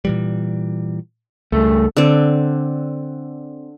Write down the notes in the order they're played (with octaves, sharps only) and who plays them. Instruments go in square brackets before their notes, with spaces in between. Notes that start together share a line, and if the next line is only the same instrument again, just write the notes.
[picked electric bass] A#2 E3 G3
[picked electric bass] C#2 [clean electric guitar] G2 A3
[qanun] D3 C4